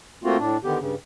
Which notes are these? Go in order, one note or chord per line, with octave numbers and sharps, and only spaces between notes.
A3 A#3 C4 F4 F#4
A2 D4
D3 D#3 B3 G4
G2 C#3